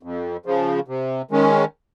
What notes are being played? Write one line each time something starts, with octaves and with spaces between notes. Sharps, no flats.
F2
C#3 F3
C3
D#3 G#3 C#4